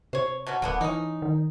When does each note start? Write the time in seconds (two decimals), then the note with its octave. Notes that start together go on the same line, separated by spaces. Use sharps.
0.13 C3 C5 C#5
0.47 B2 F#3 C#4
0.62 D1 D3 A#3 B3
0.81 E3 C#4 D#4
1.22 D#3